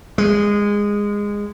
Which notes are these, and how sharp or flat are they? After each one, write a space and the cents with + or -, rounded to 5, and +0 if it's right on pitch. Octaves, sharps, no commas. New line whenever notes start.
G#3 -15